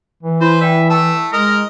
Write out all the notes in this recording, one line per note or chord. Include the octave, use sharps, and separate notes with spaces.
E3
E4 B4 C5
D5 E5 G5
A3 A4 E6
G#3 A#4 D#5